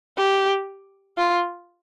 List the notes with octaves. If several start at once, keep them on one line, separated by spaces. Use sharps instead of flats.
G4
F4